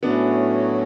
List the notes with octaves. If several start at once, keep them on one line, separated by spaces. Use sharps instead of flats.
A2 F#3 A3 B3 C#4 D4 F#4